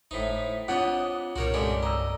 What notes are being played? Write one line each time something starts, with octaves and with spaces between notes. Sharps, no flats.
G#1 A2 D#4 C5 B6
C4 D4 F4 C#5 D#5 F#5 D#6
C2 G2 A#2 F#4 A#4 C#5
C#3 G#3 G4 A4 D5 D6
D#5 A#5 E6